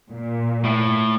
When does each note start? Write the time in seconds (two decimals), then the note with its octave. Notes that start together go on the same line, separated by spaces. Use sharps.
0.13 A#2
0.64 A2